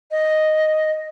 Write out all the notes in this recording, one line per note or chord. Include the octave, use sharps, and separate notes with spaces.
D#5